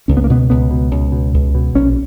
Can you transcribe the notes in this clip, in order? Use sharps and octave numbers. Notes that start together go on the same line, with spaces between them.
C#2 C#4
B3
A#3
B2 B3
C#2 B3
B2
C#2
B2
C#2
B2
A#1 C#4